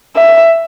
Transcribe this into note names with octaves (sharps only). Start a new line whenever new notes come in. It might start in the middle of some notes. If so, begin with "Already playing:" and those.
E5